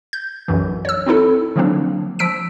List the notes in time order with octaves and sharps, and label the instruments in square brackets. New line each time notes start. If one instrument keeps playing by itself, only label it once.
[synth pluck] G6
B1 F#2 E3
C#5 E6
C4 D#4 E4 A4
D3 F3 F#3 A#3 C4 D4
F3 E6 B6 D7